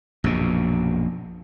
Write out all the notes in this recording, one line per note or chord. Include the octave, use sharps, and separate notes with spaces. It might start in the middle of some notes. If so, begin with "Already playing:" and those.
A#1 F#2 B2